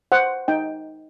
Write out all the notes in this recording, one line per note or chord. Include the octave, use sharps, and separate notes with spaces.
C5 F#5
D#4 G5